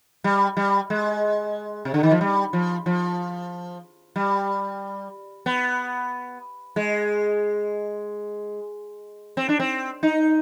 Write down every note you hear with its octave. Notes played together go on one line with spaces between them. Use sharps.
G3
G3
G#3
C3
D3
D#3
F3
G3
F3
F3
G3
B3
G#3
C4
D4
C4
D#4